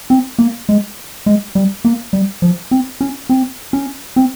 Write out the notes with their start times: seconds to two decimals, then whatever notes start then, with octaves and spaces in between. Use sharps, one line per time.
0.10 C4
0.39 A#3
0.69 G#3
1.26 G#3
1.55 G3
1.85 A#3
2.13 G3
2.42 F3
2.71 C4
3.01 C#4
3.29 C4
3.73 C#4
4.16 C4